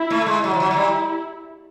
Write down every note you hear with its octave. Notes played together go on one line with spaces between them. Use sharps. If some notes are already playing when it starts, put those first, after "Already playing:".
Already playing: E4
A3
G#3
F#3 E4
F3
F#3
F#3
G3